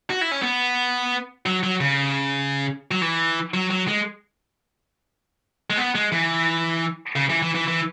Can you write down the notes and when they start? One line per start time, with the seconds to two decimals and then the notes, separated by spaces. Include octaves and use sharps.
0.10 F#4
0.21 E4
0.31 C#4
0.42 B3
1.46 F#3
1.63 F#3
1.80 C#3
2.91 F#3
3.01 E3
3.54 F#3
3.70 F#3
3.88 G#3
5.70 G#3
5.77 B3
5.95 G#3
6.12 E3
7.16 C#3
7.29 E3
7.42 E3
7.55 E3
7.68 E3